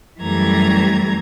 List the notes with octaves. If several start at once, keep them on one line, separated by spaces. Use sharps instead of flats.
F#2 E3 G3 A3 A#5 G#6